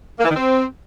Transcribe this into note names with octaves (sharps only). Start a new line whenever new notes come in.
A#3
E3
D#3
C4